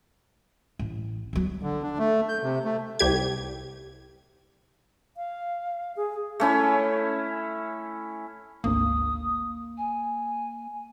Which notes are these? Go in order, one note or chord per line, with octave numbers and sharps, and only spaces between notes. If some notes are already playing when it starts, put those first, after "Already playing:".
A1
E2 F#3
D3
D4
A3
G6
C3
A3
C2 G4 G#6
F5
G#4
A3 C#4 E4
G#1 D2 A#3 D#6
G#5